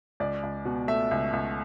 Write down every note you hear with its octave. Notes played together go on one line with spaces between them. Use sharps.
C#2 D5
C#2
B2
A3 E5
C#2
C#2